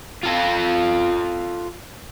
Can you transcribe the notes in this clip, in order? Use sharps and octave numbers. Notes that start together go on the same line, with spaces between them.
F4 A4